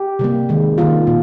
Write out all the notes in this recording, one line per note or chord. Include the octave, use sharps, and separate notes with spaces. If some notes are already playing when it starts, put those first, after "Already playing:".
Already playing: G4
C3 G3 A#3
D#3 G#3
D#3 G3 A#3 F4
A#2